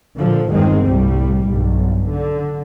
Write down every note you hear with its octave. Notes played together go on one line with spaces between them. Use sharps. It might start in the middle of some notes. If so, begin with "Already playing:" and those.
A#2 D3 F3
G1 E2 D#3 G#3 C4
C2 A2 G3
B1 G2
D3